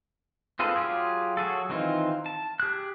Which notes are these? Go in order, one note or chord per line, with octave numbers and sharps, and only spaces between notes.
C4 F4 G#4 A4 B4
F#3 F4 G4 G#4
F#3 F#4 G#4 A4
D#3 E3 C4 D#4 F4
A5
G4 G#4 F#6